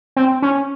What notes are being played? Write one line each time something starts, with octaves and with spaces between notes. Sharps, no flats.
C4
C#4